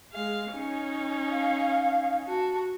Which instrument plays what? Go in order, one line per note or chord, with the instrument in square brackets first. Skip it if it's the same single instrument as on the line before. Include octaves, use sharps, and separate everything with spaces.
[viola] G#3 F5
C#4 D#4
[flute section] F5
[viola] F#4 [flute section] A5